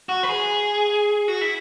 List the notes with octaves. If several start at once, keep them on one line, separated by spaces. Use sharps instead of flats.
F#4
B4
G#4
F#4
E4